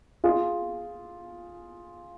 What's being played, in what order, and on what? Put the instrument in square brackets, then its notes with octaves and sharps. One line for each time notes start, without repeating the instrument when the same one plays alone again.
[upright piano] F4 G#4